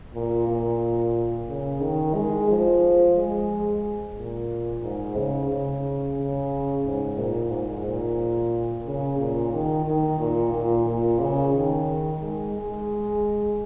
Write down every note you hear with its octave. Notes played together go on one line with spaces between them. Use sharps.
A#2
A#2
C#3
D#3
G#3
F3
G#3
A#2
G#2
C#3
C#3
C#3
G#2
A#2
G#2
A#2
C#3
A#2
D#3
D#3
A#2
A#2
A#2
C#3
D#3
G#3
G#3